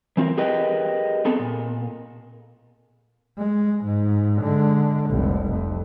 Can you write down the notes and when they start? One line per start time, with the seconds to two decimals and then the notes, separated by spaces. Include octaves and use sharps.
0.17 E3 C4 F4 A#4
0.38 G4 G#4 A#4 B4 D#5 G5
1.25 B3 C4 G#4 A4
1.39 A#2
3.38 G#3
3.84 G#2
4.42 D3 G#3
5.10 F1 C2
5.52 F2